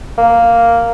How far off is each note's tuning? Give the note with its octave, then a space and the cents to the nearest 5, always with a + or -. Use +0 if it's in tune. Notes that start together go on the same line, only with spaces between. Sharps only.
A#3 -5